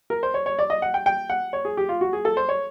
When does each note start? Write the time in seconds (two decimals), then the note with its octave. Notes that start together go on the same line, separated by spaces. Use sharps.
0.10 A#4
0.23 C5
0.34 C#5
0.46 C#5
0.59 D5
0.70 D#5
0.82 F#5
0.94 G5
1.06 G5
1.30 F#5
1.53 C#5
1.65 G#4
1.77 G4
1.89 F4
2.01 F#4
2.13 G#4
2.25 A4
2.37 C5
2.49 C#5